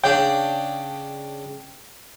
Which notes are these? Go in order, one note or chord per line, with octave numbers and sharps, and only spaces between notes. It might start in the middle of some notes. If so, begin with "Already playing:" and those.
C#3 D4 G5